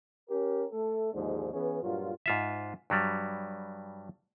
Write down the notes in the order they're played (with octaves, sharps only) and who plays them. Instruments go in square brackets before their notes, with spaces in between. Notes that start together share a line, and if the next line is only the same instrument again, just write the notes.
[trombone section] C#4 G4 A#4
A3 A4
D#2 G#2 D3 F3 G#3
E3 B3 C#4 G#4
G2 A#2 F#3 F4
[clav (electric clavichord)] G#2 F4 E5
G2 F#3 G3